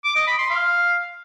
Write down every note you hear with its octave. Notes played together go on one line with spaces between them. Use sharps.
D6
D#5
B5
C6
F5